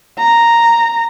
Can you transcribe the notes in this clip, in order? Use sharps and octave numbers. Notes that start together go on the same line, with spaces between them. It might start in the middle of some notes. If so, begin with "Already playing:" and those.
A#5